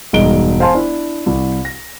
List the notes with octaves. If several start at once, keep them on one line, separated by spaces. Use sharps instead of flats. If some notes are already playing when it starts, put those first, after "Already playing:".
E1 G2 G#3 D#4 D7 G7
C5 F5 G#5 A5 C6
D4 E4
C2 E4
A#6